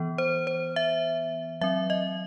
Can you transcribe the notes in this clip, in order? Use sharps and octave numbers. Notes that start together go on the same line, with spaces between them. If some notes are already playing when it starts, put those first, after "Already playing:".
Already playing: E3 B3
C5
C5
E5
F#3 C4 E5
D#5